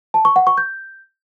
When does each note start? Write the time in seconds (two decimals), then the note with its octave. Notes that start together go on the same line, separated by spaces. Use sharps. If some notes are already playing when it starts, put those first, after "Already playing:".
0.14 A5
0.25 C#6
0.36 F#5
0.47 C#6
0.58 G6